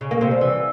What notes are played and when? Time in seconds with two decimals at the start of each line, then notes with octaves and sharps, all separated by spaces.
0.01 C#3
0.11 A#3
0.21 C3
0.31 G3
0.41 E3